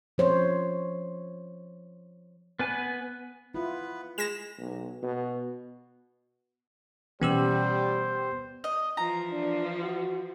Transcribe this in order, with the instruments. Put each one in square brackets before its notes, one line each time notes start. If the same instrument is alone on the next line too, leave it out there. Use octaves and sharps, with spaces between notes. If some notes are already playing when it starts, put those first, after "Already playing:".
[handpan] F3 C5 C#5
[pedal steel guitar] B3 B4 G#5
[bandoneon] B3 B4 [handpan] E4 F4
[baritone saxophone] G#3 [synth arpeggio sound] A#6 E7
[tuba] B1
B2
[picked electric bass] B2 E3 C#4 [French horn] G3 [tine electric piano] B3 G4 E6 [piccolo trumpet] C5
[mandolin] D#5
[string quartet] E3 F3 [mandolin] A#5
[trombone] D4
F#4